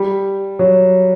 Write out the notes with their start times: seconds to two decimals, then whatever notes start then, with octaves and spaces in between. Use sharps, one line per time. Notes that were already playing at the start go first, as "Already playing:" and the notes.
Already playing: G3
0.59 F#3